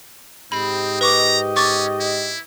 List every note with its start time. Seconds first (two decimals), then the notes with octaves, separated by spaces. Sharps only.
0.52 G#2 C4 G4 D#5 B5
1.01 B4 A#5 C#6 D6
1.56 C#4 C#6 D6 A6
2.00 E4